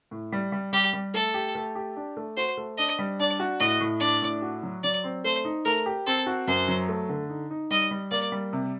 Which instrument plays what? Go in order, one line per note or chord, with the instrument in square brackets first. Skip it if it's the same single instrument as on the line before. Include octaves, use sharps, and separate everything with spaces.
[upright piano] A2
G3
G3
[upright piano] G3 [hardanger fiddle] G4
[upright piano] G3
[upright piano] A3 [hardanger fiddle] A4
[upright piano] G4
A3
G4
D4
A3
[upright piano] F#4 [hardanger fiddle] C5
[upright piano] A3
[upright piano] D4 [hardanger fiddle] D#5
[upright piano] G3
[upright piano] D4 [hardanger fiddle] D5
[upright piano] F#4
[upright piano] A2 [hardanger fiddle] D#5
[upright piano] A2
[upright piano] D4 [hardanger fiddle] D5
[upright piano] A2
F#4
F#3
[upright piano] F#3 [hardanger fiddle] D5
[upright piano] C4
[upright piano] A3 [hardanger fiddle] C5
[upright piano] D#4
[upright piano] A3 [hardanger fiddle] A#4
[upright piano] G4
[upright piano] C4 [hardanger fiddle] A4
[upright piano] F#4
[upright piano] F#2 [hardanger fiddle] C5
[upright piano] F#3
A3
D3
D#4
D#4
[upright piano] G3 [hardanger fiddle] D#5
[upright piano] G3
[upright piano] A#3 [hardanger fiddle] D5
[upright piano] G3
C3